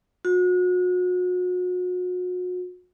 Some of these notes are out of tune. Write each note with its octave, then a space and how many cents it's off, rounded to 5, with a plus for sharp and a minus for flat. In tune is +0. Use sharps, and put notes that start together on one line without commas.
F#4 -35